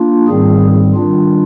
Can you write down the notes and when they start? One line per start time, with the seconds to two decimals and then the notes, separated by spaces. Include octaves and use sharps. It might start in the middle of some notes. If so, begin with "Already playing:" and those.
Already playing: A#3 D4 F4
0.28 G#2 D#3 G3 C4 G#4
0.95 D#3 G3 D4 F4